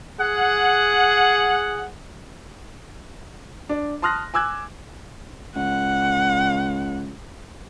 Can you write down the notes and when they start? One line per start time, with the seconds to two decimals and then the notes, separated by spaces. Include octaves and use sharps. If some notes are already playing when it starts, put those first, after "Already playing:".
0.21 G#4 F#5
3.69 D4
4.02 A5 C6 D#6 F6 F#6 A#6
4.34 G#5 D6 E6 F#6 G#6
5.56 C#2 F#5